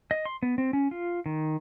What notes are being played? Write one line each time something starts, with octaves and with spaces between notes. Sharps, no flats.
D#5
C6
B3
C4
C#4
F4
D#3